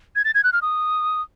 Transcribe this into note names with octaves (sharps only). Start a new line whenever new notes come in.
G#6
A6
G#6
F#6
F6
D#6